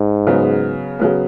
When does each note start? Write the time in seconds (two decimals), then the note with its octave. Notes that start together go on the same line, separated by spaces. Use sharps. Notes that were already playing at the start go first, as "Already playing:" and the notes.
Already playing: G#2
0.27 C#3 F#3 B3
0.99 C#3 F#3 B3